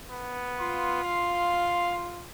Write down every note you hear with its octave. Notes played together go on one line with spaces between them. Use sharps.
B3
F4 C6
F5